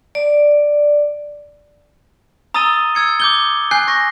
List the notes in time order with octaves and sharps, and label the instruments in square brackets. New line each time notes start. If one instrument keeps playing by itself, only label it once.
[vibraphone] D5
[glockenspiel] A#5 D#6 E6 A6 D#7 G7
E6 G#6 C#7
D6 G6 G7
G#5 F#6 G6 C7
C#6 A#6